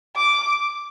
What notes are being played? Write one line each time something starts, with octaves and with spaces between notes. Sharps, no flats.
D6